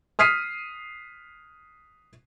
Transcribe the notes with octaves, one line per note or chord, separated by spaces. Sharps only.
D#6 F6 B6 C7 D#7